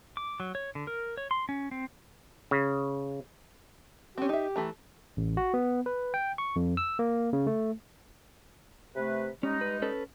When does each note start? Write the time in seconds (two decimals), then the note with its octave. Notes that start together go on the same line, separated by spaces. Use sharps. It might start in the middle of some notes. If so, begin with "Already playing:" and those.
0.17 D6
0.40 F#3
0.55 C#5
0.75 D3
0.87 A#4
1.17 C#5
1.31 C6
1.49 C#4
1.71 C4
2.51 C#3
4.18 C4 C#4 G4
4.29 D#4 E5
4.56 E3 A3 A#5
5.17 A1
5.37 F#4
5.54 B3
5.86 B4
6.14 G5
6.38 C#6
6.56 F2
6.77 E6
6.99 A#3
7.33 C#3
7.47 A3
8.95 C3 A3 B4
9.43 G3 G#3 C#4 D#4
9.61 B4
9.82 C#4 A4 B4